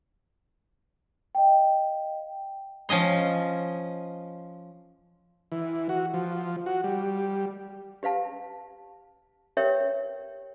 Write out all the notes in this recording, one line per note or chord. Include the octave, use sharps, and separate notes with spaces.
D#5 F5 G5
F3 C#4 D#5 C6
E3
F#4
F3
F#4
G3
G4 B4 F5 A5
G4 A#4 B4 C#5 E5 G5